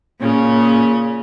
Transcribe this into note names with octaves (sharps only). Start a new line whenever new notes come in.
A#2 C#3 C#4